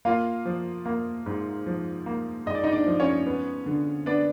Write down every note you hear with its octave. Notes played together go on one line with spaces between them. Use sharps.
A#3 F4 F5
F3
A#3
G#2
F3
A#3
G#2 D#5
D5
D#4 D#5
D4 D5
F3
C#4 C#5
B3
D3
B3 D4 D5